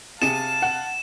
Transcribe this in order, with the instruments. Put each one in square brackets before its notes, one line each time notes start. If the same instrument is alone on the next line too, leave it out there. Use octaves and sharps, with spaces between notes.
[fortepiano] C3 G#4 [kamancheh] F5 A5 [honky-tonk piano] A6 C#7 D#7 [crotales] E7
[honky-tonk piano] F#5